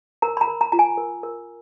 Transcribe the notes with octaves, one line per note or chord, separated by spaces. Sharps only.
A#4 A#5
B5
A#5
A#4
A#5
F4 A#5
G#5
A#4
A#4